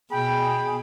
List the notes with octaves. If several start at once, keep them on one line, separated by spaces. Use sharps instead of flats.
B2 G#4 G5 B5